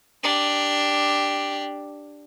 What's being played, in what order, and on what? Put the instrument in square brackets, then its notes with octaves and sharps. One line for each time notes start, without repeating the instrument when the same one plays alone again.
[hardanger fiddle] D4 G4